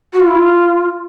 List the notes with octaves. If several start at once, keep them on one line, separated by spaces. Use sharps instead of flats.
F#4
F4
E4
F4